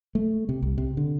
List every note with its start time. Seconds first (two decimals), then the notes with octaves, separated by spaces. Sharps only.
0.15 A3
0.49 C3
0.62 C2
0.78 C3
0.97 D3